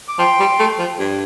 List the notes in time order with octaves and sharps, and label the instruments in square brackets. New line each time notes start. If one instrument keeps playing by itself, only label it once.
[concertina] D6
[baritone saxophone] F3 [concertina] G5 C6
[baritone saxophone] G3
A3
F3
G2